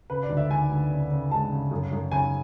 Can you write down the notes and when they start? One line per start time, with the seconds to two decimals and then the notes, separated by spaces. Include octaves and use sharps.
0.10 C#3 B4
0.23 D5
0.29 D2
0.37 E5
0.50 D2 G#5
0.70 D2
0.91 C#3
1.11 C#3
1.31 G#3 A5
1.51 C#3
1.71 F#2
1.92 F#2
2.12 C#3 G#5